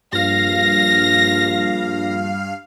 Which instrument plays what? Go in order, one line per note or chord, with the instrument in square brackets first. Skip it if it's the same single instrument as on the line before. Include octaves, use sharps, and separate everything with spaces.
[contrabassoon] A#1 [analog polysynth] G2 F5 [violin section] A#6